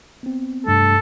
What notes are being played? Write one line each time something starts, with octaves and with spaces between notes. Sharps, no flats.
B3 C4
G2 C3 A3 A4